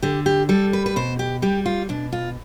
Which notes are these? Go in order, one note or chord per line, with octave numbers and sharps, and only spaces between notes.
D3 G4
G4
G3 A4
B4
B4
B2 C5
G4
G3 G4
F4
B2 D4
F4